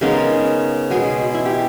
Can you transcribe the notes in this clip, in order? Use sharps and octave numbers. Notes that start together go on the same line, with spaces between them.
C#3 G#3 B3 D#4 A#4
B2 G#3 B3 G#4
E4
G4